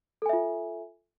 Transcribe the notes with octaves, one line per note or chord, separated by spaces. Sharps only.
F4 A4 E5 G#5